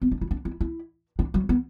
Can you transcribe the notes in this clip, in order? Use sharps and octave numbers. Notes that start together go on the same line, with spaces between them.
B3
D4
E4
D4
E4
E4
D4
F#3
B3